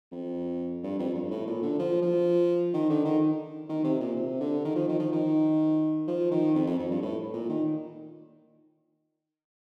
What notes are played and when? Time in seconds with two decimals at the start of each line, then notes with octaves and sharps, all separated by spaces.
0.12 F2
0.84 G2
0.99 F2
1.15 G2
1.31 A2
1.47 A#2
1.62 D3
1.79 F3
2.02 F3
2.74 D#3
2.89 D3
3.05 D#3
3.69 D#3
3.84 C3
4.00 A#2
4.16 C3
4.40 D3
4.65 D#3
4.75 F3
4.88 D#3
4.99 F3
5.12 D#3
6.07 F3
6.31 D#3
6.55 F2
6.67 F2
6.79 F2
6.91 G2
7.02 A2
7.33 A#2
7.49 D#3